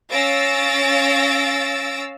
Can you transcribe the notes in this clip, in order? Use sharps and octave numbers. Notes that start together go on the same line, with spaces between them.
C#4 F5 E6 A6 A#6 D7